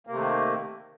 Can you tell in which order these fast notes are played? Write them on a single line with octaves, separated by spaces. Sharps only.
A#3 C3 A3 D#3